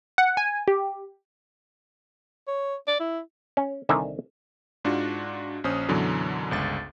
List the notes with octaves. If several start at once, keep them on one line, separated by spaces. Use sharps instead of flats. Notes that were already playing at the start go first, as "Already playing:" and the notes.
F#5
G#5
G4
C#5
D5
E4
C#4
C2 D3 D#3 E5 G#5 A#5
G#2 D4 F4 F#4
A#1 C#4 C5 D#6
F#2 B2 D3 E3 F#3
G1 C#2 A6